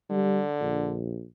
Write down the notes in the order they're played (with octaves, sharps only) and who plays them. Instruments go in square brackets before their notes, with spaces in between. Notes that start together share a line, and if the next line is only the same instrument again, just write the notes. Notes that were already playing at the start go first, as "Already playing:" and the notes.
[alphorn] D3 [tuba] G3
[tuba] A#1